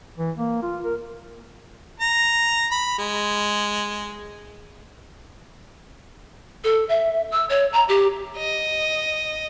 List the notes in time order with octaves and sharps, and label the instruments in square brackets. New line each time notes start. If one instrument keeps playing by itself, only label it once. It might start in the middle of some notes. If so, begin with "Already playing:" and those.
[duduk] E3
A#3
F4
A#4
[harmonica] A#5
B5
G#3
[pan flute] A4
E5
E6
C#5
A#5
G4
[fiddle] D#5